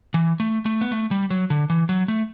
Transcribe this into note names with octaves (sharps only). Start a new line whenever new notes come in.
E3
A3
A3
B3
A3
G3
F#3
D3
E3
F#3
A3